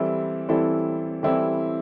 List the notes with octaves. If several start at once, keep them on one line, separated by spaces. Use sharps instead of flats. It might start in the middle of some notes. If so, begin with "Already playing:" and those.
Already playing: E3 G3 C4 E4 A4
E3 G3 C4 E4 A4
E3 G3 C4 E4 A4